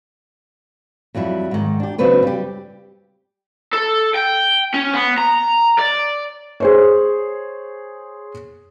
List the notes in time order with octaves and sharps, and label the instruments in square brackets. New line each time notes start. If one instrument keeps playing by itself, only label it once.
[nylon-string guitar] F2 F#3 G3 E4
G#2 D#3
D4 G4
C#3 F#3 C4 D4 B4 C#5
G3 G4
[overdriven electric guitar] A4
G5
C#4
B3
A#5
D5
[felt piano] G#4 C5 C#5